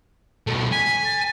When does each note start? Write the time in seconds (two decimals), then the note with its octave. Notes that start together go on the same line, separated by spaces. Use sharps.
0.47 B2 A3
0.72 G#5 B6
1.05 A6